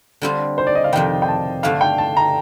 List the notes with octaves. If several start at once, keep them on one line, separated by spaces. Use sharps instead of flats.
D3 G3 C4 F4
C5
D5
D#5
F5
F2 C3 D#3 G5
G5
A5
G2 D3 A3 D4 F5
G5
A5
A#5